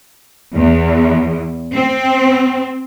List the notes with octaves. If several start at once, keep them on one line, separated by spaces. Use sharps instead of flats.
E2
C4